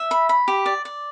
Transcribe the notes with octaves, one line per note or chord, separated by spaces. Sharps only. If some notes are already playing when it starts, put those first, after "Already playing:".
Already playing: E5
B5
B5
G4
D5
D5